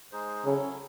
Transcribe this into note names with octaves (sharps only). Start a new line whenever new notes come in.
G#3 D#4 G#4 C5
C#3 F#3 C#4 E4 A4